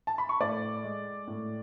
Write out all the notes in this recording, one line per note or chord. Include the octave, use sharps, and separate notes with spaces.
A5
B5
C#6
A2 D5 D6
G#3
A2